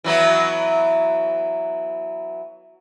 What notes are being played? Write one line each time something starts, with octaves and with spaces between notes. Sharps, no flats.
E3 F#3 B3